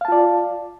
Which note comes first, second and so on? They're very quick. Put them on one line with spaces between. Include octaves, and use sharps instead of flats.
F5 A5 F4 D5